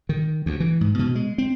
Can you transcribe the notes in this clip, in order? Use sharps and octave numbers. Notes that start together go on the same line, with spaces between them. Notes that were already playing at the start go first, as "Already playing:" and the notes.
D#3
D2
E3
G#2
B2
G#3
C4